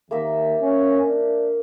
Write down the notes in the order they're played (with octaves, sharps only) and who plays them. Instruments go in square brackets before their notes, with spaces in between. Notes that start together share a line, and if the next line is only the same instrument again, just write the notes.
[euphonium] D#2 [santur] A#3 A#4 E5
[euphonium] C#4
D4